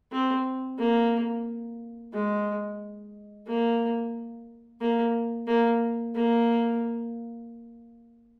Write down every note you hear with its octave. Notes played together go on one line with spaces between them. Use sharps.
C4
A#3
G#3
A#3
A#3
A#3
A#3